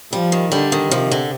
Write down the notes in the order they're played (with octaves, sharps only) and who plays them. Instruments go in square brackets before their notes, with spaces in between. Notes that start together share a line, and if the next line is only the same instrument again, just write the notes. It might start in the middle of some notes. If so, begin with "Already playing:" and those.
[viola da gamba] F3 [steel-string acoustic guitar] G3
[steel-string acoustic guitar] D#3
[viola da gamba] D3 [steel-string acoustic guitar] G3
[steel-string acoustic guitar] D#3
[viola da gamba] C3 [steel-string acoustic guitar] F3
[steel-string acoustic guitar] D3